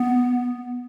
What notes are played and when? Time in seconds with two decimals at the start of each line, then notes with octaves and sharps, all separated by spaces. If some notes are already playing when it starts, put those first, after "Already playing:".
Already playing: B3